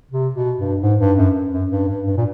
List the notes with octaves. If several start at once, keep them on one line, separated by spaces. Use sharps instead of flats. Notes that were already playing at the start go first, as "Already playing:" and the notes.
C3
B2
G2
G#2
G2
F#2
F#2
G2
G2
G2
A#2